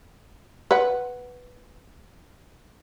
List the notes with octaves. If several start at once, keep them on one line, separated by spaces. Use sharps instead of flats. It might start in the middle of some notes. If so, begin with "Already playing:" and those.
B4 F#5